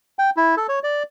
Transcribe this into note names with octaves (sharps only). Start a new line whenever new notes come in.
G5
E4
A4
C#5
D5